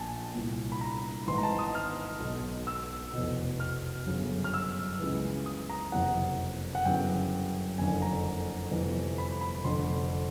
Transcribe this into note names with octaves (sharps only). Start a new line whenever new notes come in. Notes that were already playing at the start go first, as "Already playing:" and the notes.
Already playing: A#1 A#2 G#5 A5
C2 A#2
B5
A#5
G#1 G#2 E3 C6
A#5
A5
D#6
F6
B1 B2
E6
F1 E2 B2
F6
G1 F#2 C#3
F6
E6
C#2 C#3 E3
D#6
A#5
F#1 F2 C3 E3 F#5
F#5
G1 F#2 C#3 E3 G5
F#1 F2 D3 G#5
A#5
G1 F2 C3 E3
B5
B5
F1 F2 D3 C6